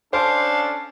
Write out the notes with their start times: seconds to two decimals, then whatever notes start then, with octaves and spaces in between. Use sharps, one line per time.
0.13 C#4 D4 A4 C5 F5